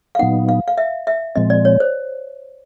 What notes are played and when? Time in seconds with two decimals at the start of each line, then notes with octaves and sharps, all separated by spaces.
0.15 F5
0.19 A#2 F#3 B3 D#4 F#5
0.49 F5
0.68 F5
0.78 E5
1.07 E5
1.36 A#2 F3 G#3 C4 D#5
1.50 D5
1.65 C#5
1.80 C5